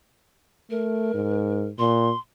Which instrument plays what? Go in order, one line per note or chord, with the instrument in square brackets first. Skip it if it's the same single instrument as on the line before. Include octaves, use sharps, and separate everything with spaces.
[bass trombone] A3 [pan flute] A#4
[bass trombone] G#2
[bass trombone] A#2 [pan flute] C6